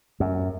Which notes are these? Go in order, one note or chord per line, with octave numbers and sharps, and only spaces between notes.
F#2